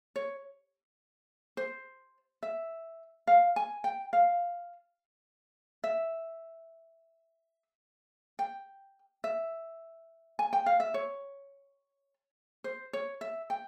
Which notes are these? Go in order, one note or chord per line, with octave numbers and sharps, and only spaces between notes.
C#5
C5
E5
F5
G#5
G5
F5
E5
G5
E5
G#5
G5
F5
E5
C#5
C5
C#5
E5
G5